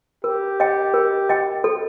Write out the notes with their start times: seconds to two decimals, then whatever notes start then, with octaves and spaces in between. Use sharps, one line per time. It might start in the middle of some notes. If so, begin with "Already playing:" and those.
0.24 G4 A#4
0.60 D#5 G5
0.94 A#4
1.29 D#5 G5
1.64 A4